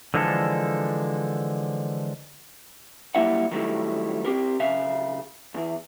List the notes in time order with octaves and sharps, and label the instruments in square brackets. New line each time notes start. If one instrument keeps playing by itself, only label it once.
[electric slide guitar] D3 E3 F3 G#3 D4 A4
[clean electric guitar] F#3 G3 A#3 E4 E5 F#5
D#3 F#3 G3 A3 E4
C4 G4 A#4
B1 C#3 E5 F5
E2 E3